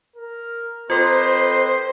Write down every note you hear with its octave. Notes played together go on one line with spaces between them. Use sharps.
A#4
C4 F4 A4 B4 C5 D#5 C6